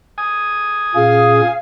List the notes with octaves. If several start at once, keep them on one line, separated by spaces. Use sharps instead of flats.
G#5 D#6
A#2 C#4 G#4 F5